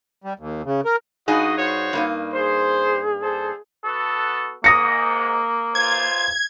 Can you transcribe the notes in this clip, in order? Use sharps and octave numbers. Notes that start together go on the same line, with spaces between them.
G3
D#2
C#3
A#4
G2 D#4 F#4 G#4 D#5
F#4 C5 C#5
G2 A#3 D#4
G#4 C5
A4 C5
B3 F#4 A4
G#2 A#3 D#6 A#6 C#7
B1 F4 C5 G#6